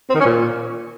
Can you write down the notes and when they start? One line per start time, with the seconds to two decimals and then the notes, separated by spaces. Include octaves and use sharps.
0.09 C4
0.15 D#3
0.20 C#4
0.25 A#2